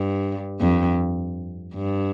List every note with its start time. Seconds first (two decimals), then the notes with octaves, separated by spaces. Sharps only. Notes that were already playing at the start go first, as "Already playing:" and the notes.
Already playing: G2
0.61 F2
1.74 G2